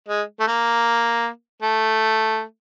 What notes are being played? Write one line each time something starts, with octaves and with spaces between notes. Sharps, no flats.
G#3
A3
A#3
A3